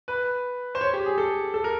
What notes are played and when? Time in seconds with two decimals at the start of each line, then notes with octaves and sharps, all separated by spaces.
0.08 B4
0.75 C5
0.81 C#5
0.93 G4
1.06 G#4
1.18 A4
1.54 A4
1.64 A#4